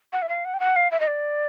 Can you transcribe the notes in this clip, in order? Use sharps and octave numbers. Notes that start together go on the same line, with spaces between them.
F#5
E5
F5
F#5
G5
F#5
F5
E5
D#5
D5